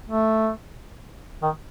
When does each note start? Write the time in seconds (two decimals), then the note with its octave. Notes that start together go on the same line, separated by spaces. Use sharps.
0.10 A3
1.42 D#3